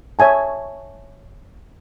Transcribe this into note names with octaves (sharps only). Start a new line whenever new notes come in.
C#5 E5 G#5 A5